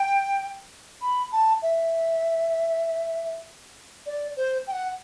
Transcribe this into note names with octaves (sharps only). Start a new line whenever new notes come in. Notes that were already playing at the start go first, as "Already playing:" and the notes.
Already playing: G5
B5
A5
E5
D5
C5
G5
F#5